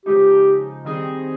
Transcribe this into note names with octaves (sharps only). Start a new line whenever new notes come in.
C#3 F3 G#3 D#4 G4
D#3 G3 C4 D#4 G#4